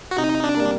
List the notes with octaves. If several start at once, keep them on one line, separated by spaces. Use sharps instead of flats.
F#4
C3 D#4
D4
G3 A#3